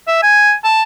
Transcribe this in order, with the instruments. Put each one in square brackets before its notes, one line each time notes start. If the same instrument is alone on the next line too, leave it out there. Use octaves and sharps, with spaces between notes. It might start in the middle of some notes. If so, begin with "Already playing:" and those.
[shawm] E5
G#5
A5